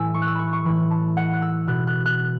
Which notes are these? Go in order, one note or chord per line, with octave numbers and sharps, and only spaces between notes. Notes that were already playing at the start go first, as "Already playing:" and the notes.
Already playing: A2 E3 G#5 E6
C#6
F#6
E6
B5 C#6
C#6
A2 E3 B5
A5
F#5
F#6
E6
B2 F#6
F#6
F#6